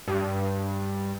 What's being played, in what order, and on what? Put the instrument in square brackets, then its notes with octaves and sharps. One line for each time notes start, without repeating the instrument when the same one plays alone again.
[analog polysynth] G2